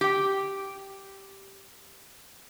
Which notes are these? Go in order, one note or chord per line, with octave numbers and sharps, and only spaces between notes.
G4 G5